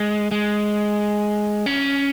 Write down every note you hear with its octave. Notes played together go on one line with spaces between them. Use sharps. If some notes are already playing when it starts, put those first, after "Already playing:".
Already playing: G#3
G#3
C#4